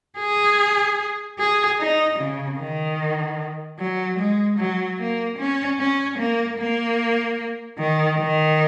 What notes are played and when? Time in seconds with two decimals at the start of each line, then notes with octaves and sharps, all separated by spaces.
0.19 G#4
1.39 G#4
1.79 D#4
2.19 C#3
2.60 D#3
3.79 F#3
4.19 G#3
4.59 F#3
4.99 A#3
5.38 C#4
5.79 C#4
6.19 A#3
6.58 A#3
7.78 D#3
8.18 D#3